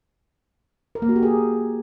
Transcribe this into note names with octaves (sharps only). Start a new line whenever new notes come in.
A#4
A#3
F#4
G4
G#4